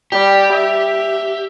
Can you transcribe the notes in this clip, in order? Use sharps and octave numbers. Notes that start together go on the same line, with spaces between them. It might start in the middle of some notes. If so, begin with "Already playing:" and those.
G3 G4
E5